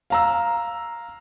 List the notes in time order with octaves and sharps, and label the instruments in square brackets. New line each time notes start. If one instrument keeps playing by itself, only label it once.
[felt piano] F5 A#5 E6